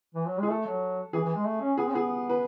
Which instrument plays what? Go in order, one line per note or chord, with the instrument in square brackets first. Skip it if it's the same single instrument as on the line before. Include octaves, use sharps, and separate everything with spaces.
[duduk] E3
F#3
[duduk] G#3 [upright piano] G#4
[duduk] A3 [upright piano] A4
[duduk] F#3
[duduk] E3 [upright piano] G#4
[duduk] E3
G#3
A3
C#4
[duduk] B3 [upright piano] G#4
[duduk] C#4
[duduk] B3 [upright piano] G#4
[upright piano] B4